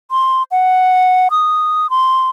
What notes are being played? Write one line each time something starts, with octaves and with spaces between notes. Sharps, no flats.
C6
F#5
D#6
C6